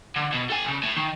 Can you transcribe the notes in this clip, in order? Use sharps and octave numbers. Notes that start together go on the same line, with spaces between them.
D3
B2
A4 G#5
D2 C#3
A2
D#3